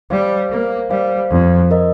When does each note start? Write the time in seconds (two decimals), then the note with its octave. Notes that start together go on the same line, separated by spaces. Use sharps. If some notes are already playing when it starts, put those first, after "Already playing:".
0.10 G3 C5 F5
0.50 A#3
0.90 G3 C5 F5
1.31 F2
1.71 A#4 D#5